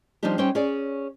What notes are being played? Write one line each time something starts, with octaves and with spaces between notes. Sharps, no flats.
F3 G3 C4 D4 D#4 G4
G3 C#4 D#4 C5 G5
C#4 G#4 C#5 D5